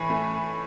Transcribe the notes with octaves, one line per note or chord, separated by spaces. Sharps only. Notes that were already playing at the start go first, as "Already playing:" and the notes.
Already playing: A2 E3 G#5 B5
A3